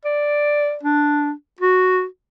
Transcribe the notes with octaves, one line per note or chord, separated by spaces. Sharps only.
D5
D4
F#4